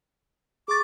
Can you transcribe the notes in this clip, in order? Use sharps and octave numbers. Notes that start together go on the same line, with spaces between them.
G#4 C#6 D6 A6